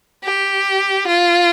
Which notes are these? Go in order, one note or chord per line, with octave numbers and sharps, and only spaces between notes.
G4
F4